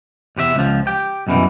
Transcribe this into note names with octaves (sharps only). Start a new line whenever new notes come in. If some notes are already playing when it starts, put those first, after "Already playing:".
E2 C3 G4 E5
C#2 F3
G4 G5
C2 F#2 B2 E3